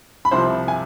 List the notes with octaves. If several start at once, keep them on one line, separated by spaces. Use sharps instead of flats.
B5
C2 C3 F3 C5 C6
G#5